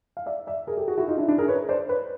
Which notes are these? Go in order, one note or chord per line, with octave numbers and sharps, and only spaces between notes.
F5
D5 E5
D5 E5
G#4 A#4
G4 A4
F#4 G#4
E4 F#4
D#4 F4
D4 E4
D4 E4
G#4 A#4
B4 C#5
C5 D5
B4 C#5